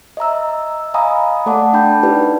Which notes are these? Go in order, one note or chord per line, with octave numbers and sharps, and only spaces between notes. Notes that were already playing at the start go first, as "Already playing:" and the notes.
D#5 E5 A#5 E6
D#5 F5 G#5 A#5 B5 D#6
A3 A4 D5 F#5 A5 D6
D4 G5 A5 B5 G6
D#4 E4 G4 B4 D5